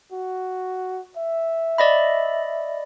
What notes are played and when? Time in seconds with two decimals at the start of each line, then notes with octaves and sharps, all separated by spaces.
0.12 F#4
1.17 E5
1.78 D5 D#5 B5